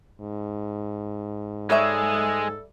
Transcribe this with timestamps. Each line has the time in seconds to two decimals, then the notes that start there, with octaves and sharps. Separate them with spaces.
0.20 G#2
1.70 G3 G#3 G#4 A4 C#5 E5